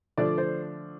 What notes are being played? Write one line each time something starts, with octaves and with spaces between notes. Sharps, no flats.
D3 F3 A3 D4 D5
C5